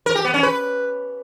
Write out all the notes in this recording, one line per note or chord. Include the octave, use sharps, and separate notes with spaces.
A#4
G4
B3
C#4
B4